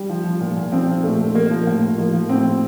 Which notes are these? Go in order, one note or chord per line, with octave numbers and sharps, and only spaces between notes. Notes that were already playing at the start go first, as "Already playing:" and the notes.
Already playing: G3
F3
F3
A#2
A#2
F3 C4
F3
A#2 A3
A#2
F3 A#3
F3
A2 A#3
A2
F3 A#3
F3
A2 C4
A2